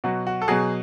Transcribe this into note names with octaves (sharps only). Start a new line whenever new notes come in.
B2 F#3 F#4
F#4
A4
B2 F#3 G#4